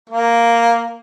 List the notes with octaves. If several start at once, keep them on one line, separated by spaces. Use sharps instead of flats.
A#3